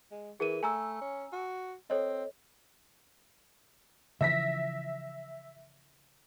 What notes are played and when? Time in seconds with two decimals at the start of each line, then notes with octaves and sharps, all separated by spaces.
0.11 G#3
0.40 E3 G#4 A#4 D#7
0.63 A3 G#5 A#5 E6
1.01 C#4
1.32 F#4
1.90 C4 A4 C#5 D#5
4.21 C#3 E3 F3 E5 A#6 B6